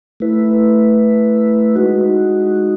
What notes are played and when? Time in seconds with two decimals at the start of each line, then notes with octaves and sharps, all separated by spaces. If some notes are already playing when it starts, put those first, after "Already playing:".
0.20 A3 E4 B4
1.75 G#3 D#4 F#4